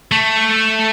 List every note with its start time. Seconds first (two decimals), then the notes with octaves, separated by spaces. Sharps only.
0.12 A3